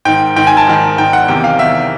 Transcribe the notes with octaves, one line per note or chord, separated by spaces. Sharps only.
G#2 D#3 G5
G#2 D#3 G5
G#5
A5
G#2 D#3
G#2 D#3 G5
F#5
E2 C3 D#3 G5
F5
E2 C3 D#3 E5